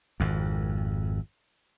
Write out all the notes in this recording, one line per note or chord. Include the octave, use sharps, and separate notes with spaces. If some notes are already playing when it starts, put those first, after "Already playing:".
G#1 F2